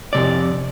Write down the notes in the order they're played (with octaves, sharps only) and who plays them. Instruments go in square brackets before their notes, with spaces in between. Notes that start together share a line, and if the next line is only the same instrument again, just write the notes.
[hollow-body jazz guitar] F2 C3 D5